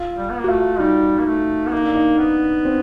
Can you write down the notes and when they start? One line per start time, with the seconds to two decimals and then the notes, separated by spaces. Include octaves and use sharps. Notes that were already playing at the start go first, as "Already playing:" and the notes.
Already playing: F4
0.18 G3
0.30 B3
0.40 A#3
0.44 F#4
0.48 A3 F4
0.80 G3 D#4
1.19 A#3
1.26 A3
1.67 B3
1.72 A#3 D#4
1.84 D4
1.95 D#4
2.18 B3
2.65 C4